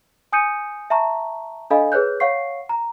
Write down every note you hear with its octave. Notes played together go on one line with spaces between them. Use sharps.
G#5 D#6 G6 C#7 D#7
E5 A5 A#5 C#6
D4 A4 D#5 F5 G#5 B5
G#4 B4 C#5 F#6 G6
C#5 F5 F#5 C#6 C7
A#5